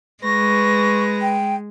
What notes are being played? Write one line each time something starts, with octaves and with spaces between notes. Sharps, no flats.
G#3 B4 C#6 A#6
G5